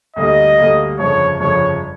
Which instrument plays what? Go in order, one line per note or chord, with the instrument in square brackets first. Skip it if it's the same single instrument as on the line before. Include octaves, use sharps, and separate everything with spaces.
[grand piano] D2 D3 G3 A#3 [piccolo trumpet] D#5
[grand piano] D2 D3 G3 A#3
[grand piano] G1 F2 C#3 F3 [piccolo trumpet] C#5
[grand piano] G1 F2 C#3 F3 [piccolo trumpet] C#5